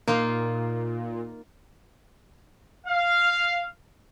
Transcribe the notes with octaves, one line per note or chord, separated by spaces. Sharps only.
A#2 A#3 D#4 F4
F5